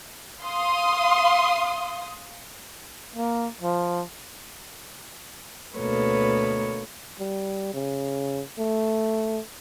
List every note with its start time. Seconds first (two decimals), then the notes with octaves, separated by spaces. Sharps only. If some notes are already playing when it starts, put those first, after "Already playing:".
0.43 F5 C6 D#6
3.16 A#3
3.62 F3
5.78 D2 B2 A#3 A4 B4 C#5
7.19 G3
7.74 C#3
8.58 A3